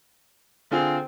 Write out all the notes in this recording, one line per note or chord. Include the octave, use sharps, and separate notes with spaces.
D3 C4 F4 G#4